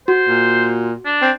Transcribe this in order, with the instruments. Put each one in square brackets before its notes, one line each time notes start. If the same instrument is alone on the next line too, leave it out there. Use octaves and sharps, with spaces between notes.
[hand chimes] F#4 [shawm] C5
[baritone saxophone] A#2
[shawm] D4
[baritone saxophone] C4